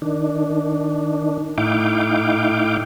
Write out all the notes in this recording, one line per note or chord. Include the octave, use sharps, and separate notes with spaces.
D#3 D4
A2 D#4 E4 F5 G5 D6